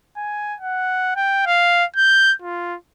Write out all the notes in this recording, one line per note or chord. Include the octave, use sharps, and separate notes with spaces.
G#5
F#5
G5
F5
G6
F4